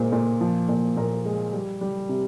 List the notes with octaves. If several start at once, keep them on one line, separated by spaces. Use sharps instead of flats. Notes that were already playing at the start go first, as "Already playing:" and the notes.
Already playing: A#2 G#3 C5
A#2
F3
A#2
A#2 A#4
G#3
G3
G3
C3